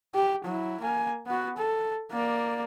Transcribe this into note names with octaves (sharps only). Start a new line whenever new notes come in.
G4
F#3 E4
A#3 G#5
B3 F#4
A4
A#3 D5